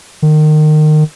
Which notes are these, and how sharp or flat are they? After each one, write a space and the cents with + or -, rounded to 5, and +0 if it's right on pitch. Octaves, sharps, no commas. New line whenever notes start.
D#3 -25